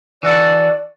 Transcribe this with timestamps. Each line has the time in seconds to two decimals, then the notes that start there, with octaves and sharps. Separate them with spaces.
0.23 E3 F#4 A4 D5